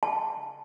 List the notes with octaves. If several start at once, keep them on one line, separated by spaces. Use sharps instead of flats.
A5